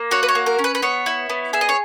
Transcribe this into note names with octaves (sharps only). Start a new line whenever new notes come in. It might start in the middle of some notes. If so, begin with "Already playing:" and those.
Already playing: A#3
F#4 C#5
B4
C#5
A#3
A#4
C#4
B4
B4
B3 C#5
E4
B3
G#4 E5
D#5
C#5